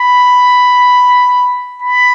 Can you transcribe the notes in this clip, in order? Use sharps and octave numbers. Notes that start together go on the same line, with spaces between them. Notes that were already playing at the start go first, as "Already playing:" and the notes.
Already playing: B5
B5